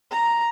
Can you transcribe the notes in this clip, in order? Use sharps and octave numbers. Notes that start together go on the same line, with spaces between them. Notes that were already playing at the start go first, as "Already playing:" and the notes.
A#5